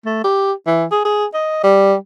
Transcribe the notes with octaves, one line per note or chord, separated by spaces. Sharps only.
A3
G4
E3
G#4
G#4
D#5
G3